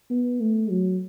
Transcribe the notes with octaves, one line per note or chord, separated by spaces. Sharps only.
B3
A3
F#3